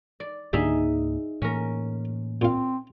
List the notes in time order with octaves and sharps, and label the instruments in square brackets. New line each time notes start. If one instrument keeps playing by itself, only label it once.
[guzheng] D5
[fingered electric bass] C#2 G#2 A#3 [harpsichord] D3 G3 [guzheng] D#4 G#4 E5
[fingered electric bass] A2 E3 A#3 [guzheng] C#4 A#4
[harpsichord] A#2 F5 [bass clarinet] C4